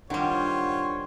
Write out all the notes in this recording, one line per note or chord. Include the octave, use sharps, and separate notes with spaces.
D#3 G3 D4 F4 C5 C#5 F#5